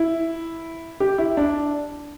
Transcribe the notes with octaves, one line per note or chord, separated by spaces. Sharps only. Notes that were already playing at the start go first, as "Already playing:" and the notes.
Already playing: E4
G4
E4
D4